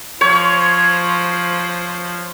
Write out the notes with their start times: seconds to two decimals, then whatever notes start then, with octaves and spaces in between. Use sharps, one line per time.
0.21 F3 C5 C#5